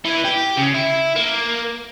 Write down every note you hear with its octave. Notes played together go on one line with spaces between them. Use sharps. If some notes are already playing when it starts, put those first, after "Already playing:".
E3
G4
C#3
E4
A#3